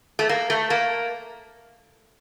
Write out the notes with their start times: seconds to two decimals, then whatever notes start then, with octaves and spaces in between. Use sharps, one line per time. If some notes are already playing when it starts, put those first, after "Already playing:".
0.19 A3
0.29 A#3
0.50 A3
0.70 A#3